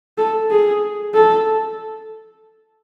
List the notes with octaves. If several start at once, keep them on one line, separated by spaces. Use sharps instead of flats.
A4
G#4
A4